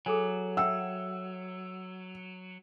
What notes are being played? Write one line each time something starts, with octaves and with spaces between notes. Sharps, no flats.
F#3 G#4 A4 G#5
E5 F#5 G5 E6